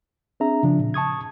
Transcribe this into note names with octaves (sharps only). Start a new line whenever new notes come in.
C4 D4 G#4 E5 A#5
C#3 F3 D4
A#2
A5 C#6 D#6 G#6